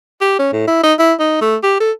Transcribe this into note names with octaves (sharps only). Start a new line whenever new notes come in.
G4
C#4
A2
E4
D#4
E4
D#4
A3
G4
A4